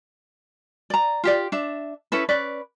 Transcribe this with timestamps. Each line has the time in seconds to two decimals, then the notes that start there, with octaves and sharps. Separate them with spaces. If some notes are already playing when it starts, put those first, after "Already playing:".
0.90 D5 A#5
1.24 F4 G4 D5
1.52 D4 E5
2.12 C#4 E4 A4 B4
2.29 C#4 B4 D5